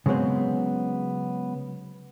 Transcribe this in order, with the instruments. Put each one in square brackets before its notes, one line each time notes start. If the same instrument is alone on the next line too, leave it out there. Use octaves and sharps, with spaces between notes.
[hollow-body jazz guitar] C#3 F#3 G#3 B3 C4